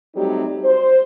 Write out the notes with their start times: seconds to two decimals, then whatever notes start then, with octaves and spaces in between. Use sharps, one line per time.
0.15 F#3 G3 A3 C4 D#4 G4
0.64 C5